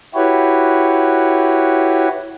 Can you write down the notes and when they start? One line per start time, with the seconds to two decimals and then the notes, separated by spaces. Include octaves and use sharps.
0.15 E4 F#4 G4 B4 C#5